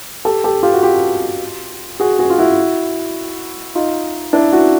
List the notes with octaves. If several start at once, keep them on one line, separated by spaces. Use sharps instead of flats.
G4 A4
G4 A4
F4 G4
F#4
F4 G4
F#4 G#4
F#4 G#4
F4
E4 F#4
D#4 F4
D4 E4
E4 F#4